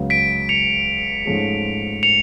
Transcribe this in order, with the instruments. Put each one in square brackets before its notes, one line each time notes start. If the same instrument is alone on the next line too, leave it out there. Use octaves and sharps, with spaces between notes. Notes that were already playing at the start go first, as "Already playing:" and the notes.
Already playing: [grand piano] C#2 C#3 F#3 B3
[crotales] B6 D7
C#7 F7
[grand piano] G#2 F3 A3 C#4 G#4
[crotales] C#7 F7